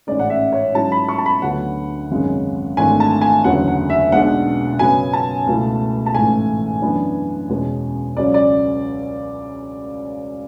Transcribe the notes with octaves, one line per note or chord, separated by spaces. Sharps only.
A1 G#2 G#3 C#4 D5
F#5
E5
C#5
G#2 F#3 C#4 E4 A5
B5
C#6
A5
B5
D2 D3 F#3 B3 F#5
G#1 F#2 C#3 G#3
G#1 G#2 E3 A3 D4 G#5
A5
G#5
F#1 E2 D3 F#3 F#5
F#5
E5
B1 B2 G#3 D4 F#5
F#2 C#3 F#3 B3 G#5
A5
C#2 B2 A3 E4
A5
A1 G#2 E3 A3 G#5
F#2 E3 B3 D4
E2 B2 G#3 C#4
C#2 C#3 F#3 C#4 D5
D5